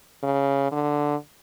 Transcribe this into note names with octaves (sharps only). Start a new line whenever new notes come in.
C#3
D3